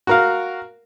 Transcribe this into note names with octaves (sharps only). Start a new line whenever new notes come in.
F#4 A#4 F5